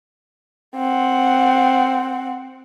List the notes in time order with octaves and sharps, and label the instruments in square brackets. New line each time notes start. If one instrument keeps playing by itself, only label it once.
[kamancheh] C4 F#5